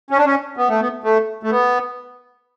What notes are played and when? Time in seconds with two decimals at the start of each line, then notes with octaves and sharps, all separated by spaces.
0.11 C#4
0.18 D4
0.26 C#4
0.57 B3
0.69 A3
0.81 B3
1.04 A3
1.43 A3
1.51 B3